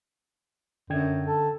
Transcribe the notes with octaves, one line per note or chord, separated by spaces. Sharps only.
F#2 D3 G5 G#6
A4